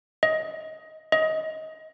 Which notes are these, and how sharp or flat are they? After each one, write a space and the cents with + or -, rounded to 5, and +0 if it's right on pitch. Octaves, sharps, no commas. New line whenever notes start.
D#5 +15
D#5 +20